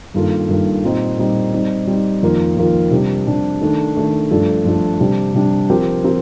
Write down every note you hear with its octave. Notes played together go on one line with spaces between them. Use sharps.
G2 D#3 A#3 F4 A4
G2 D#3 A#3 F4 A4
A#2 G3 C4 D#4
A#2 G3 C4 D#4
G3 C4 D#4
G3 C4 D#4
F2 D#3 A#3 F4 A#4
F2 D#3 A#3 F4 A#4
C3 G3 D4
C3 G3 D4
D#3 A3 D4 A4
D#3 A3 D4 A4
G2 F3 A3 D4 A4
G2 F3 A3 D4 A4
C3 G3 D4
C3 G3 D4
F3 C4 G4 A#4
F3 C4 G4 A#4